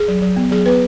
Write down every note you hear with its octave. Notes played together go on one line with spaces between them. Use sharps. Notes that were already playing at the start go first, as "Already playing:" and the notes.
Already playing: G#4
F#3
F#3
B3
F#3 G#4
B3 B4